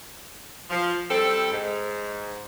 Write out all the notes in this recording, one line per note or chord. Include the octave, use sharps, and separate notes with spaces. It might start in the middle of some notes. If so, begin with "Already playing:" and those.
F3
G3 C4 A4
G#2